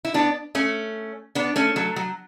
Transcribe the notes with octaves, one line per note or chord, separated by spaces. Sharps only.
E4
B3 D4
A3 C#4
B3 D4
A3 C#4
F#3 A3
F#3